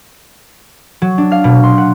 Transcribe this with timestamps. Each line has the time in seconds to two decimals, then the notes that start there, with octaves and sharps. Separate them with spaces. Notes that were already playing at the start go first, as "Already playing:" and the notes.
1.02 F#3
1.18 D4
1.32 F5
1.44 B2
1.64 C6
1.78 F#5